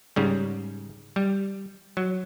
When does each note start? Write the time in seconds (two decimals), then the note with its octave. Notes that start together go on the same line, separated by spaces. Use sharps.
0.16 G#2 C#3 G3
1.16 G3
1.97 F#3